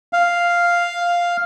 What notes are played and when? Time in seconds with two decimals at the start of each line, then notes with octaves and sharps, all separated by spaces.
0.13 F5